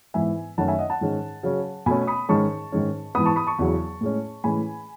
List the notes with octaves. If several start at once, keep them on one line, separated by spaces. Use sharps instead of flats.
G#2 E3 B3 E5 G#5
F#2 D#3 A3 C#4 F#5 A5
E5 G#5
D#5 F#5
F#5 A5
G#2 D#3 G#3 C#4
C#3 F#3 C#4
B2 A3 C#4 G#5 B5
B5 D#6
G#2 D#3 G#3 C#4 A5 C#6
G#2 D#3 G#3 C#4
G#2 E3 B3 B5 D#6
A5 C#6
B5 D#6
A5 C#6
E2 C#3 F#3
A2 G#3 C#4
A2 E3 G#3 C#4 G#5 B5